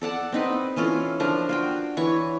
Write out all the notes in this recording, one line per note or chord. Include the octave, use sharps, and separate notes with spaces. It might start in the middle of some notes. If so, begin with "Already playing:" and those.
A4 D5 F#5 A5
C4 D#4 B4
E3 C#4 F4 A4
F3 D4 F4 A#4
F4 F#4 G5
E3 C#5 C#6